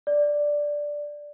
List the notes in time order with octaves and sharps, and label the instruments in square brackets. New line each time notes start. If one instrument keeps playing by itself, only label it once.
[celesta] D5